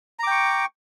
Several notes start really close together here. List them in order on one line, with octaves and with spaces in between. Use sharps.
A#5 D6 G5 C#6